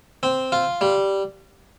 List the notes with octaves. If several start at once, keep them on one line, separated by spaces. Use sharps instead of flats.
C4
F4
G3